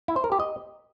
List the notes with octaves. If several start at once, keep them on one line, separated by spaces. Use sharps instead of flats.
E4
C5
A#4
G4
D#5